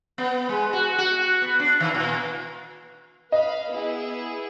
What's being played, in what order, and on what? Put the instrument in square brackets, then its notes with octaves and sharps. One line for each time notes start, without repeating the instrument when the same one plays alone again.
[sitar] B3
G#3
F#4
F#4
B3
D4
D#3
A#2
[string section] B4 F5 B5 [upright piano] D#5
[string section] B3 E4 G#4